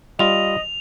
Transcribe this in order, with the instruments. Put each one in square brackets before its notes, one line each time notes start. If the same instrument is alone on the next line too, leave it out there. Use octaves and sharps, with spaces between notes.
[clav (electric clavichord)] G3 F4 [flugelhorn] D#5 [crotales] F7